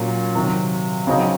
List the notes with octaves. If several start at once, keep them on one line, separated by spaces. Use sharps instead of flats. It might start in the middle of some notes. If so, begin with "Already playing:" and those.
Already playing: A#2 F#3 C#4
C3 D#3 F#3
C#3 F#3 C4 D#4